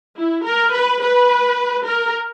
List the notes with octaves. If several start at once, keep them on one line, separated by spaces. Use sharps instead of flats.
E4
A#4
B4
B4
A#4